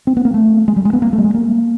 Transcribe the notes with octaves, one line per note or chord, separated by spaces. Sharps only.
C4
B3
A#3
A3
G#3
G3
G#3
B3
A#3
A3
G3
G#3
A#3